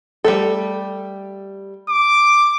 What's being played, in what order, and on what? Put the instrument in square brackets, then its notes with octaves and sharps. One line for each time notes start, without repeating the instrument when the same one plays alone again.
[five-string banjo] G3 A3 A4
[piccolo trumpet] D6